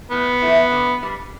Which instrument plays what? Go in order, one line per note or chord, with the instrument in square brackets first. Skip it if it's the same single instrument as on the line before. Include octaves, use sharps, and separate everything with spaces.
[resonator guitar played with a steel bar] A2 [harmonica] B3
[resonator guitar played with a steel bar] E3 A3 E4
D3
G3 D4